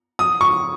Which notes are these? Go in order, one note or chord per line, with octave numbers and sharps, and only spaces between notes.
D#6
C#6